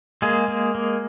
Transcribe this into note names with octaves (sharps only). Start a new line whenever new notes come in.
G#3 A#3 G#4
A#3
A#3